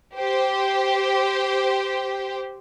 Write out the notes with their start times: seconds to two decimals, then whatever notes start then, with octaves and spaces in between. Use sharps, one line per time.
0.16 G4 C5